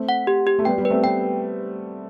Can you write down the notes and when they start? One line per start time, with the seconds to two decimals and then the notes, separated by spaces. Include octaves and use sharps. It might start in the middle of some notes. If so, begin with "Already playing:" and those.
Already playing: A3 C4
0.09 F#5
0.27 G4
0.47 G4
0.59 A3
0.65 G3 B3 G5
0.78 G3 B3
0.85 B4
0.90 A3 C4
1.03 B3 G5